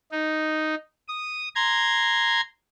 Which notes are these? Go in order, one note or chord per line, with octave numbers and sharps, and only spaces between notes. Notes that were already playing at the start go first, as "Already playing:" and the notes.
D#4
D#6
A#5 C6 G#6